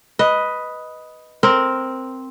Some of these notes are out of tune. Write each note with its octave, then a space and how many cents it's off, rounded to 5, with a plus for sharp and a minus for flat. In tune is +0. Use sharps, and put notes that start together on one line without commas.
B4 +0 D#5 +5
C4 +0 A#4 +0